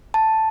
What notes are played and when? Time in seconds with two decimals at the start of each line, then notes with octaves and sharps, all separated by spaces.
0.14 A5